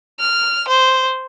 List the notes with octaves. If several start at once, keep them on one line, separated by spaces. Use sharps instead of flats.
F6
C5